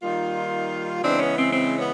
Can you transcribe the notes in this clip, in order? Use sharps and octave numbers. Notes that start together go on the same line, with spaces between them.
D#3 G3 A#3 D#4 F4
C#3 E3 G#3 B3 C4 D4
B3 C#4
C4
C4
B3 C#4